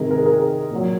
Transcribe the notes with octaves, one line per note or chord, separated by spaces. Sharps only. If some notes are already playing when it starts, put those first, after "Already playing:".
Already playing: C3 D#3 G#3 G#4 A#4
G#4 A#4
G#4 A#4
A#2 F#3